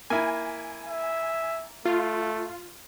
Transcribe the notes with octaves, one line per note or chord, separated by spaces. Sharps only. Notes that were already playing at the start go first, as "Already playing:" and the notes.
A#3 E4 G#5
E5
A3 F4